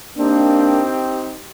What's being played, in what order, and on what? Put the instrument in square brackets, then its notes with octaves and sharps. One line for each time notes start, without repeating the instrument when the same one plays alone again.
[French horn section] A#3 D4 [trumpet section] C4 D#4 G4